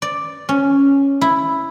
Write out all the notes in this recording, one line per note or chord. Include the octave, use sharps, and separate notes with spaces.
D5
C#4
E4